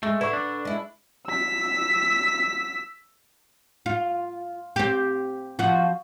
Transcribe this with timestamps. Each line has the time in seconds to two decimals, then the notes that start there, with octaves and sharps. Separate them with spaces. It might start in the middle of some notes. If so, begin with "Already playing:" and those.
0.03 G#3 A3
0.21 D3 E4 B4 C#6
0.33 D4
0.65 G#3 E4
1.27 E6 B6
3.86 F4
4.76 C4 G4
5.59 F3 F4 F#4